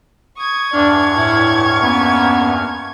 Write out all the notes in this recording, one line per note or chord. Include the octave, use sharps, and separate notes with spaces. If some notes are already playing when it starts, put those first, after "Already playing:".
C#6 D#6 G#6
E2 G2 D4 F6
A2 E4
A#3 B3 C#4